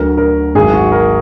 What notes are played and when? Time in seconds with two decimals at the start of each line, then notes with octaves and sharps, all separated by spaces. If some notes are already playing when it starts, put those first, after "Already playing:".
Already playing: D2 D3 F#3 A#4
0.17 A#4
0.55 G#1 G#2 F#3 G#4
0.74 F#4
0.92 A#4